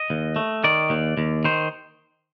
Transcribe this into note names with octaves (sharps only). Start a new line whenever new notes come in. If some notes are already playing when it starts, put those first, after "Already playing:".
Already playing: D#5
D#2
A3
D#3 D5
D#2
D#2
D#3 C5